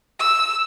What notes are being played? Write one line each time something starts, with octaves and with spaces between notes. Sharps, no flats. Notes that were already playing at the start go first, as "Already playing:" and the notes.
E6